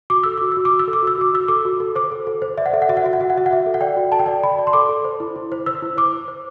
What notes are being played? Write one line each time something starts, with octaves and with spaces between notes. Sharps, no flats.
F#4 D6
A4 E6
F#4 D6
F#4 E6
D6
F#4
E6
A4
D6
F#4 E6
F#4 D6
F#4 E6
A4 D6
F#4
A4
C5 D6
A4
A4
C5
D5 E5
F#5
A4 E5
F#5
F#4 E5
F#5
F#4 E5
F#5
F#4 E5
F#5
F#4 E5
F#5
F#4 E5
A4
F#5
D5 G5
F#4
A4 A5
G5
D5 A5
D5 B5
D5
C6
A4 D6
A4
C5
E4
E4
C5
C5 E6
E4
C5 D6
C5
C5